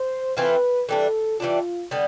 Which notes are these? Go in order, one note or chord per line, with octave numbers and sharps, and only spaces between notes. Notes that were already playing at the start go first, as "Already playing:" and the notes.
Already playing: C5
E3 A3 C4 F4 B4
E3 G3 D4 A4
E3 G3 D4 F4
D3 G3 B3